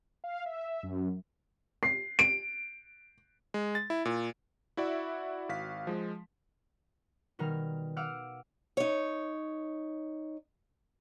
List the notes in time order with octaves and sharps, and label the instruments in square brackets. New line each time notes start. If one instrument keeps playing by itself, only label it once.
[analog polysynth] F5
E5
F#2
[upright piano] C7
D7
[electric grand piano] G#3
A6
E4
A#2
E4 F#4 D5 E5 F#5
G#1 F#4 F5 B6
F3 G#3
[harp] B2 D#3 G3 A#4 F6
F5 F#5 D6 E6 F6
[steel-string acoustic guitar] D#4 C#5